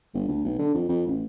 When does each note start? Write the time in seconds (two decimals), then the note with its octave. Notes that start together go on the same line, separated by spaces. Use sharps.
0.14 G1
0.28 D2
0.45 B1
0.59 D3
0.74 F2
0.89 F2
1.07 A1